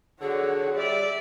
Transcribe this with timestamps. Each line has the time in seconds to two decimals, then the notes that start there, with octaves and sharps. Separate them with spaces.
0.21 D3 F#4 G#4 C#5
0.76 G3 D5 E5